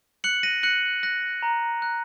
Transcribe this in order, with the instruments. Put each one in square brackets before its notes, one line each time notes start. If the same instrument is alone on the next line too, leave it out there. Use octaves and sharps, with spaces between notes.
[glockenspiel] F#6 C#7 F#7
A#6 D#7
F#6 C#7 F#7
F#6 A#6
A#5
F#6